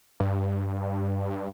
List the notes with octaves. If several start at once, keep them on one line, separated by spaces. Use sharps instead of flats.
G2